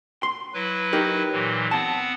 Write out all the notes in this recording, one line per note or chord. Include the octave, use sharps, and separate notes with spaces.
C6
F#3 E4 B4
D#4 G4 A#4
A#2 E3 F#3
B3 C4 F#5 A5